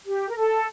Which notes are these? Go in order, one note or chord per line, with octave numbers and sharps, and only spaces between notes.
G4
A#4
A4